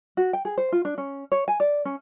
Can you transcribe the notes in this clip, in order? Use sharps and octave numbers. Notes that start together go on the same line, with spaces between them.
F#4
G5
G#4
C5
F4
D4
C#4
C#5
G#5
D5
C#4